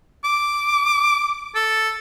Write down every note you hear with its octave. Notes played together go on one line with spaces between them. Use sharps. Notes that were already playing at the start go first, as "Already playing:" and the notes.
D6
A4